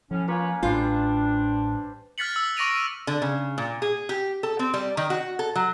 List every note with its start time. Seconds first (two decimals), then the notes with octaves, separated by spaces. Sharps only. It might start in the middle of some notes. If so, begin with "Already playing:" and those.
0.11 A2 F3 C#4
0.28 A#3 C#4 F4 B4 C#5
0.63 A1 A2 G3 D4 F4 B4 C5
2.18 F6 F#6 A6 B6 C#7 F#7
2.36 E6
2.57 C#6 D6 A#6 D7 D#7 F7
3.07 D3
3.22 C#3
3.58 A#2
3.82 G#4
4.09 G4
4.43 A4
4.59 C4
4.74 G3
4.97 D#3
5.10 F#4
5.39 A4
5.55 F#3